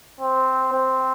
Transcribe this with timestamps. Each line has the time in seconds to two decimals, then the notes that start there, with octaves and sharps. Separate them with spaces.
0.21 C4
0.73 C4